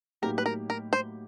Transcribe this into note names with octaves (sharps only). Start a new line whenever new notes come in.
A2 F#3 A#3 D#4 G4 A#4
B4
A#4
A#4
C5